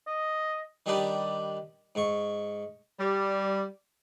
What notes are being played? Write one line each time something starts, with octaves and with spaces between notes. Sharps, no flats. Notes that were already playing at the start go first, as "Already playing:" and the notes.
D#5
D#3 G3 D4 D#4 G4 B4
G#2 C#6
G3